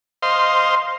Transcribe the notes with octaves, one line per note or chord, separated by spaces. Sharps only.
C5 D#5 F5 C6